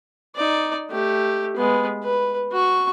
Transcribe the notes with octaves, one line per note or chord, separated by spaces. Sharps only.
D#4 D5
A3 G4
G#3 B3
B4
F#4 C#6